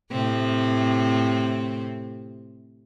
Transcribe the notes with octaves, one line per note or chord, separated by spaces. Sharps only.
A2 C3 C4